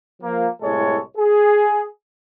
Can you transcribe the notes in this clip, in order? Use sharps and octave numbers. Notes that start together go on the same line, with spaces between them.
F3 A#3
C2 A2 G#3 A4 C#5
G#4